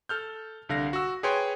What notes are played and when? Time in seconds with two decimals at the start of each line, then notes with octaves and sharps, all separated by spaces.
0.09 A4 F6 G6
0.69 C2 D3 F5 A#6
0.93 F#4 E6
1.23 G#4 B4 C#5 G5 C6 G#6